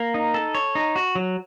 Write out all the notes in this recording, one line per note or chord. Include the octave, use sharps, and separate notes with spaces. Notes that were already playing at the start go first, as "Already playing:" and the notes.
Already playing: A#3
D#4
A4
C#5
D#4
F#4
F#3